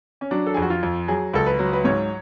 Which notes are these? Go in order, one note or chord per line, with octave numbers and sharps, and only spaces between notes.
C#4
F#3 D4
A4
F2 G#4
F#4
F4
F2
F#3 G#4
C#2 A4
B4
F#3
B4
G#2 C#5